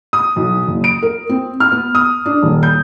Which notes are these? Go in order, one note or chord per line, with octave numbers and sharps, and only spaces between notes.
D#6
B1
F#1
D7
A#4
C4
F6
B3
D#6
D4
D#1
G6